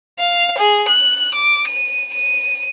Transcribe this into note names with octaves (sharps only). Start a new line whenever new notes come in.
F5
G#4
F#6
D6
D#7
D#7